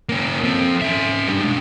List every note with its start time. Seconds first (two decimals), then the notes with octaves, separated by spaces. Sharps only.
0.09 A#3 C#4
0.43 F3 C4
0.82 C#4 E5
1.28 G3 D4
1.41 G#3 D4